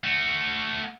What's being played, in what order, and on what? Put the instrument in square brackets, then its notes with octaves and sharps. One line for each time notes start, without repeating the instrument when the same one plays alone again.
[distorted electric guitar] A3 F#4